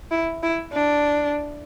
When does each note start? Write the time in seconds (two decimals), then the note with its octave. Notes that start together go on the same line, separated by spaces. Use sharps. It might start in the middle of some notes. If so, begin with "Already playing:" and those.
0.11 E4
0.43 E4
0.73 D4